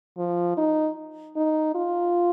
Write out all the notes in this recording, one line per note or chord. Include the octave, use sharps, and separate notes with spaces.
F3
D#4
D#4
F4